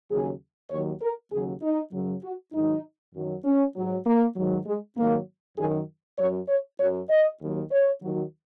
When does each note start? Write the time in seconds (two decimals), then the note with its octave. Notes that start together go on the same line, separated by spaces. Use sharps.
0.09 D#2 C#3 F#3 G#4
0.71 D#2 D#3 F#3 C#5
1.02 A#4
1.32 D#2 C#3 F#3 G#4
1.62 D#4
1.92 F#2 C#3 F#3
2.23 F#4
2.53 G#2 D#3 F#3 D#4
3.14 F#2 D#3 F#3
3.44 C#4
3.76 G#2 F#3
4.06 A#3
4.36 G#2 D#3 F#3
4.66 G#3
4.97 G#2 D#3 F#3 A#3
5.58 F#2 D#3 F#3 G#4
6.18 F#2 F#3 C#5
6.48 C#5
6.79 F#2 F#3 C#5
7.09 D#5
7.40 D#2 D#3 F#3
7.71 C#5
8.01 D#2 D#3 F#3